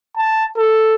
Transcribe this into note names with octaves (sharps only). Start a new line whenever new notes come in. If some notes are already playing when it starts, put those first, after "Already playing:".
A5
A4